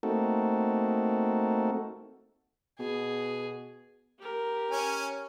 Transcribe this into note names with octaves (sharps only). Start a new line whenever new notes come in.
A3 A#3 C4 D#4 F#4 A4
B2 G#4
G4 A#4
C#4 G#5